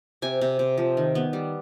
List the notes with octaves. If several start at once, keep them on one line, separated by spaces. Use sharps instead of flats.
C3 G#5
C3
C3
F3
D#3
B3
G3